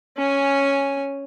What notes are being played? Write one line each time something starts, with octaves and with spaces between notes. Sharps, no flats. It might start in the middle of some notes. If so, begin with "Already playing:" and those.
C#4 G#5